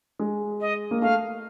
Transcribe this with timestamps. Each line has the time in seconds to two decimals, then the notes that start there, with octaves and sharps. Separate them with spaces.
0.19 G#3
0.60 D#5
0.91 A#3
1.01 A3 F5